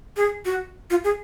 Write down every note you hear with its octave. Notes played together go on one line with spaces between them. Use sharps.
G#4
F#4
F4
G#4